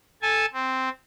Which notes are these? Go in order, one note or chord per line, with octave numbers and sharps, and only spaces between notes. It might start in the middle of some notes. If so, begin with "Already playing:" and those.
A4 G#5 A5
C4